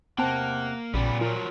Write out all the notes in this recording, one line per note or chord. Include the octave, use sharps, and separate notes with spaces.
E2 C3 A#3 C4 C5 F#5 G5 A5
A#1 A#2 C#3 G3 B3
F3 F#3 F4 A#4